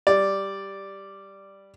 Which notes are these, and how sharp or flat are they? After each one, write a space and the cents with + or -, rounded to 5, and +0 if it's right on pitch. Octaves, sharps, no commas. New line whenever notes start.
G3 +0 D5 +0